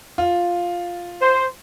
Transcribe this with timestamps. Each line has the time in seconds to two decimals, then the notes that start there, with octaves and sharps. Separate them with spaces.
0.18 F4
1.22 C5